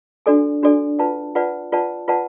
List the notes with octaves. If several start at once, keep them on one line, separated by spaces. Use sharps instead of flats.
D4 F#4 A4 D5 G#5
D4 F#4 A4 D5 G#5
F4 B4 D5 F#5 A5
F4 B4 D5 F#5 A5
F4 B4 D5 F#5 A5
F4 B4 D5 F#5 A5